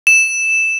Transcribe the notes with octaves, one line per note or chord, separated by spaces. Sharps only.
E7